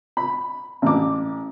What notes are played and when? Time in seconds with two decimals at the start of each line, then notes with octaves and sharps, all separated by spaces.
0.17 B5
0.82 A1 D6